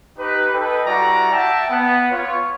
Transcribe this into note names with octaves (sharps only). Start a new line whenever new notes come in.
D#4 G4 B4
A4 B4 D#5 G5
G3 E4 F#4 D5 A#5
E5 F#5 G5 A5
B3
F4 C#5